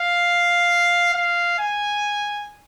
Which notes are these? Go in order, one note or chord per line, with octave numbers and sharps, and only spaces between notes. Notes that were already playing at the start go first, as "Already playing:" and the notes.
Already playing: F5
F5
G#5